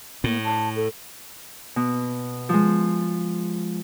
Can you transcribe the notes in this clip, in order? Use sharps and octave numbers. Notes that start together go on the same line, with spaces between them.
A2 A#3
A5
A4
B2
F3 G#3